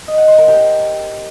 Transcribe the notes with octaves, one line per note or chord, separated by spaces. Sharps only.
D#5
F#5
C5
A#4
G4